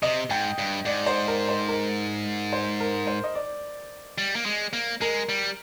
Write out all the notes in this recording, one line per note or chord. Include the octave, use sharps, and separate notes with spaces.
C3 D#5
G#2 G5
G2
G#2 D5
C5
A#4
C5
A#4
C5
A#4
C5
D#5
D5
G3
A#3
G#3
A#3
G#3 A#4
G3